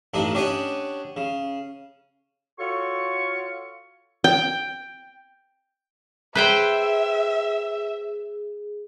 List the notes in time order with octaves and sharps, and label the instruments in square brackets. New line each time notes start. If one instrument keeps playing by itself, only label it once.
[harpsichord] A1 G2 D4 D#4 B5
C#4 D4 G4 C#5 D#5 F#5
C#3
[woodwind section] F4 F#4 A4 C#5 C#6
[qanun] G5
[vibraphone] G#4 [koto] B4 C5 G5 [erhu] E5